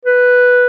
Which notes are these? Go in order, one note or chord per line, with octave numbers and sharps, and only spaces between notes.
B4